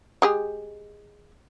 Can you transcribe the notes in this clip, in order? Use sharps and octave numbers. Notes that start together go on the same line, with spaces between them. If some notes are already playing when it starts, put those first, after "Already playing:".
G#3 G4 G#4